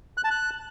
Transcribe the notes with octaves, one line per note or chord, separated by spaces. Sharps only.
F#6
A5
F#6